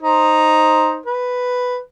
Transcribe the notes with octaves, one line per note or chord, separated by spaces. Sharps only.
D#4 C5
B4